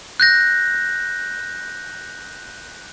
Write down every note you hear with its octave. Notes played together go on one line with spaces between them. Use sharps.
F#6 G6 A#6